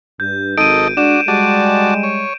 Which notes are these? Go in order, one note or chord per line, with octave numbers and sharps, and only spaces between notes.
G2 G6
G#1 D#4 A4 D#5 D7 D#7
G#3 D4 F#4 D5 E7
G3 G#3 F#4 D5 A5
C#5